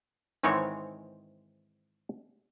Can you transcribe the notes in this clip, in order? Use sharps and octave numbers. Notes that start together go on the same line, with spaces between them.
G#2 D#3 E3 G#3 C4 C#5